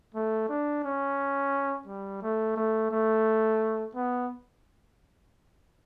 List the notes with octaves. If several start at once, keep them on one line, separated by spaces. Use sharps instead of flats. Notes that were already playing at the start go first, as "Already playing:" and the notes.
A3
D4
C#4
G3
A3
A3
A3
B3